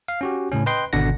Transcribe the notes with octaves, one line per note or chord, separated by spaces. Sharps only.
F5
C#4 F#4 G4
A2 C#3 C#4
B4 D#5 G5 C6
G#1 B2 D3 D4 F#5 A#6